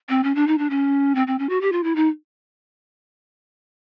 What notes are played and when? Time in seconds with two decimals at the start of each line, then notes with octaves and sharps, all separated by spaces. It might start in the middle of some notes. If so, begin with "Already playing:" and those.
0.09 C4
0.24 C#4
0.35 D4
0.47 D#4
0.58 D4
0.70 C#4
1.15 C4
1.27 C4
1.39 C#4
1.49 F#4
1.61 G4
1.72 F4
1.84 E4
1.96 D#4